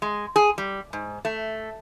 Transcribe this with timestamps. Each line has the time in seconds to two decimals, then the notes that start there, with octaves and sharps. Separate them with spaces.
0.02 G#3
0.36 G#4
0.58 G3
0.93 G#2
1.25 A3